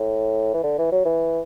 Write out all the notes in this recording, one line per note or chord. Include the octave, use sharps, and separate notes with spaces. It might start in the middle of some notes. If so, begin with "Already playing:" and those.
Already playing: A2
E3
D3
E3
F#3
E3